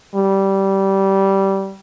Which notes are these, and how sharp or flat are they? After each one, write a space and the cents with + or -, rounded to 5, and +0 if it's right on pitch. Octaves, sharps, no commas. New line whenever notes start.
G3 -15